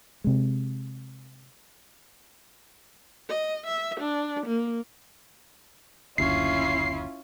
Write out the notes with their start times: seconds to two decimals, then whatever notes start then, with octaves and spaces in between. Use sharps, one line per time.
0.24 C3 G#3
3.29 D#5
3.67 E5
4.00 D4
4.46 A#3
6.18 F#1 D2 C#4 E4 F4 C7